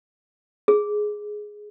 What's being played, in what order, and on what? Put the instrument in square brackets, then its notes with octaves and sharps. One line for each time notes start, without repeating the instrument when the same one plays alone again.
[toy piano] G#4